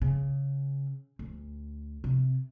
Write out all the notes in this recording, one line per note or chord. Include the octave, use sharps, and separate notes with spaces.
C#3
D2
C3